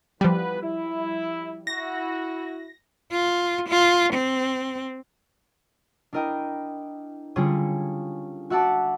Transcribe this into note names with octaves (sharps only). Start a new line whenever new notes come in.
E3 F3 G3 B3 B4
E4
E4 F#4 A#6
F4
F4
C4
D4 E4 A#4 D#5 G5
D3 G3 C#4 F4 G#4 C#5
F#4 E5 F#5 A5 D6